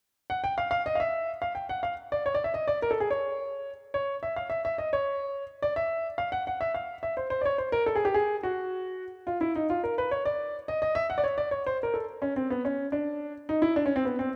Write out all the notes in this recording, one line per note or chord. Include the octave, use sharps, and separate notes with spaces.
F#5
G5
F5
F5
D#5
F5
E5
F5
G5
F#5
F5
D5
C#5
D5
E5
D#5
D5
A#4
A4
G#4
C#5
C#5
E5
F5
E5
E5
D#5
C#5
D5
E5
F5
F#5
F#5
E5
F5
E5
C5
C5
D5
C#5
C5
A#4
A4
G#4
G4
G#4
F#4
F4
E4
D#4
F4
A#4
B4
C#5
D5
D#5
D#5
E5
F#5
D5
C#5
D5
C#5
C5
A#4
A4
C#4
C4
B3
C#4
D4
D#4
E4
D4
C#4
C4
B3
C4